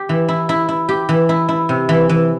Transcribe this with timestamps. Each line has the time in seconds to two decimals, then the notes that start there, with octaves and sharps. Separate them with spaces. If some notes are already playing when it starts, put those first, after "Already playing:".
Already playing: G4
0.09 E3
0.29 E4
0.49 E4
0.69 E4
0.89 G4
1.09 E3
1.29 E4
1.49 E4
1.69 C3
1.89 E3
2.09 E3